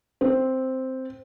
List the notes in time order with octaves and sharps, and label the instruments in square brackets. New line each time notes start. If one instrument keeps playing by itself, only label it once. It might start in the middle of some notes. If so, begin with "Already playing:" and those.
[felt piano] C4